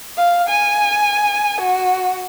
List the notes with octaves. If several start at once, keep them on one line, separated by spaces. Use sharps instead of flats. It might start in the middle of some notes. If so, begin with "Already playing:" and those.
F5
G#5
F#4